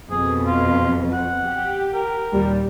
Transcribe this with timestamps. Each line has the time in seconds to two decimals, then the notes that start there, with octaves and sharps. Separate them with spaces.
0.11 F2 B2 G#4
0.47 F4
1.13 F#5
1.46 G4
1.94 A#4
2.32 D#2 A#2 G3